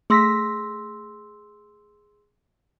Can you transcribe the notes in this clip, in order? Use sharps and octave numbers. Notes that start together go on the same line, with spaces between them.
A3 G#4 C6 E6 A#6 B6